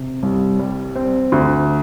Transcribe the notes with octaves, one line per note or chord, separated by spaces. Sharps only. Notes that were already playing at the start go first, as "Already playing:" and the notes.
Already playing: C3
C2
G3
C4
D2